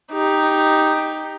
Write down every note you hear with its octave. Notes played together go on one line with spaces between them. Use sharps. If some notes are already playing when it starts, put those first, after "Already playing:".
D#4 G4